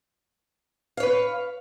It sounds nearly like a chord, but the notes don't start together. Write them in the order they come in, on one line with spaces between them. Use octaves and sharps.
F5 C#5 B4